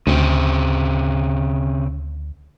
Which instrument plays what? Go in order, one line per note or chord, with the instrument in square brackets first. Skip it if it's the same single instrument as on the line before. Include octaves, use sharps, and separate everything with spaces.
[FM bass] D2 [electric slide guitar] C#3 C4